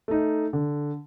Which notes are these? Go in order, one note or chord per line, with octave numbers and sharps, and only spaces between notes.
A3 D#4
D3